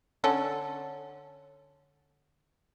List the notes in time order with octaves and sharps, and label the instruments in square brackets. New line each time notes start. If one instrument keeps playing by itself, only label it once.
[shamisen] D3 C#4 A4